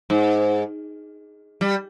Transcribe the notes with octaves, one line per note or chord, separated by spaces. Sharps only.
G#2
G3